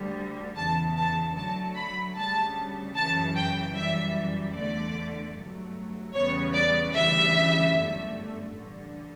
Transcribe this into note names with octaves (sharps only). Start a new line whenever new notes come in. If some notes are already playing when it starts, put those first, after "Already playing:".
Already playing: D2 D3 G3
E2 C#3 E3 A5
A5
D2 D3 F#3 A3 A5
B5
D2 C#3 G3 A5
F#2 C#3 E3 A5
G5
F#2 E3 G3 E5
E2 D3 A3 D5
G1 G2 F#3 A3
E2 C#3 G3 B3 C#5
D5
D2 C#3 E3 G3 E5
G1 F#2 D3 A3
A1 G2 D3